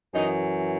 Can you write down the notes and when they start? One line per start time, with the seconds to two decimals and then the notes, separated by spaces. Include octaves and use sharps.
0.14 F#2 E3 D#4